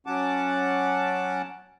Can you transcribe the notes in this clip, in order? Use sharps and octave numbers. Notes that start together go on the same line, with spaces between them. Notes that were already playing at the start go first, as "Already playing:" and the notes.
F#3 C#4 F#5 A5 D6